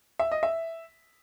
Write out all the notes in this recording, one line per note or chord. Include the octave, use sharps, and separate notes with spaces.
E5
D#5
E5